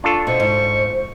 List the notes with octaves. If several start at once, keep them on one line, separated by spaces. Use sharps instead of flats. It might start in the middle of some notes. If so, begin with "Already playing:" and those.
D4 F4 A4 C#6
B2 C5 C#6
G#2